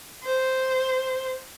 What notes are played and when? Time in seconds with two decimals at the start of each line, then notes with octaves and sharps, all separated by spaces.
0.24 C5